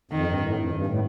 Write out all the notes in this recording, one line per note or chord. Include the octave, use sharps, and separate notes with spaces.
F2 D#3
G2
A2
F2
G2
A2